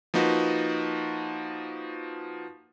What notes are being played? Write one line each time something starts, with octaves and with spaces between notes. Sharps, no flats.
F3 A#3 D#4 F#4 B4